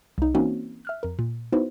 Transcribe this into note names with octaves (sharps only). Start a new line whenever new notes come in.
C2 D#4
E3 A#3 C4 C#4 D#4 F#4
E5 F6 F#6
F2 A#4
A#2
B3 D#4 E4 F#4 B4 C5